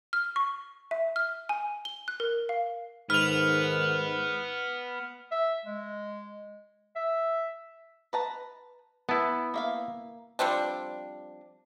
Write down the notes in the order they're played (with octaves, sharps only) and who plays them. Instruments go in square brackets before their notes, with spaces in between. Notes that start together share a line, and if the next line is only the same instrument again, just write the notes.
[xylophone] F6
C#6
E5
F6
G#5
G7
F#6
A#4
F5
[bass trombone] G#2 [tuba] D#3 [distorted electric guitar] B3 [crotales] F6 F7
[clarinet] E5
G#3
E5
[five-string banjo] B4 A5 A#5
[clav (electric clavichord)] B3 E4 [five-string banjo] A5
[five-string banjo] A#3 E5 F5
[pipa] F3 G3 C4 D4